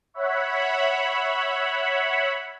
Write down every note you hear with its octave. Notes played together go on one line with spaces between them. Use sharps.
C#5 E5 F#5 B5